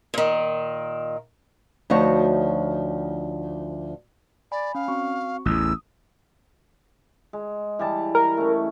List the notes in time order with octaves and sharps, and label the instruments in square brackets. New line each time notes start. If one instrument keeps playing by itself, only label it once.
[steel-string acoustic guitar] A#2 D#3
[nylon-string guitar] D2 F3 D#4 F#4 C#5
[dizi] D5 [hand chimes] G#5 B5
[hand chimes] C#4 [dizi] F5
[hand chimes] C4 F#4 C#6
[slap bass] A1 E2 [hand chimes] D#6 [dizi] E6
[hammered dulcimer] G#3
E3 G3 A5
[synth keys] A#4
[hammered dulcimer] A3 C#4